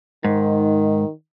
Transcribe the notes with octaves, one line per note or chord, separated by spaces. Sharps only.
G#2 D#3